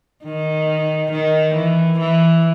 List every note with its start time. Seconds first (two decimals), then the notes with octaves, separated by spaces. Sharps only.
0.24 D#3
1.11 D#3
1.55 E3
1.99 E3